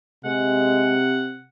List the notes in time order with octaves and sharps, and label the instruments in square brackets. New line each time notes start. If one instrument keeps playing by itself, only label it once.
[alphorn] C3 [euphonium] G#3 [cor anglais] F#5